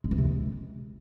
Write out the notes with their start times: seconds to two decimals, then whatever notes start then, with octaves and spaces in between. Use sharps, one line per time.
0.04 G#3
0.11 E3
0.18 C3
0.25 G#3